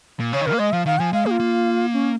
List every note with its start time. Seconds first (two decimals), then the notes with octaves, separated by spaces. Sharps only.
0.20 A#2
0.33 C#3 C#5
0.41 D#3
0.46 C#3 A#4
0.53 A#3
0.59 G#3 D#5
0.73 F3 F5
0.86 D#3 F5
0.99 F3 G#5
1.13 G#3 F5
1.26 A#3 G#4
1.31 F4
1.40 A#3
1.93 C#4